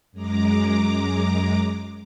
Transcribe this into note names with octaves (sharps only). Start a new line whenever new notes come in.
F#2 G#3 A#5 D6